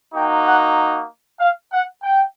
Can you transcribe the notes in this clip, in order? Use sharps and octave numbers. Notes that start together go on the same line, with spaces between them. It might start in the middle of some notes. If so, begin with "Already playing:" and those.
A#3 D#4 F#4 G5
F#5
F5
F#5
G5